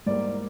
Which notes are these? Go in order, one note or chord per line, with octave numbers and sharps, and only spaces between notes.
G#2 G3 A#3 D5